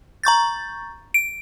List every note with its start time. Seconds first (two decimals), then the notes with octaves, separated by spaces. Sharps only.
0.24 A#5 C#6 G6 A6
1.14 D7